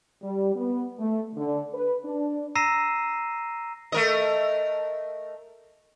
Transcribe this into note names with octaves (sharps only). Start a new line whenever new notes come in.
G3
B3
A3
D3
B4
D4
A#5 E6 A#6 C7 D#7 E7
A3 A#4 D#5